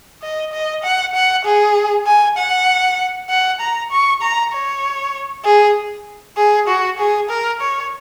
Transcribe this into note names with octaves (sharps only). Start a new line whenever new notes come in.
D#5
D#5
F#5
F#5
G#4
G#5
F#5
F#5
A#5
C#6
A#5
C#5
G#4
G#4
F#4
G#4
A#4
C#5